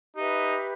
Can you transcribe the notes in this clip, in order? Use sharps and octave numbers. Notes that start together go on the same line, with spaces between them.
D#4 G4 B4 E5